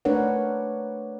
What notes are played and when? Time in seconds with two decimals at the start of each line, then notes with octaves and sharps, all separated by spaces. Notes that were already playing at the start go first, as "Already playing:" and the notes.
0.05 A3 D4 A#4 B4 C#5 F#5